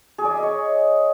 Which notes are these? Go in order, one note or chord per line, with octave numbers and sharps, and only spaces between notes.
G#4
D5
E5
D#5
C#5